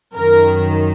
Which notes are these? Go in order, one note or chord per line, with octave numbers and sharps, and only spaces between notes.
F#2 D#3 A#4